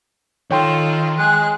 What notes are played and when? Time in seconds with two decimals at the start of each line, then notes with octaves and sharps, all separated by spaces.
0.51 D#3 F4 A4 C#5 G5 C6
1.18 G#3 F#6